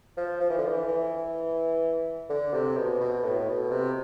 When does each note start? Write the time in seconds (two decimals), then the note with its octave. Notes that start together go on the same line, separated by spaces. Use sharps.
0.17 F3
0.40 F3
0.50 E3
0.58 D3
0.68 E3
0.88 E3
2.30 D3
2.53 C3
2.77 B2
3.00 B2
3.24 A2
3.48 B2
3.71 C3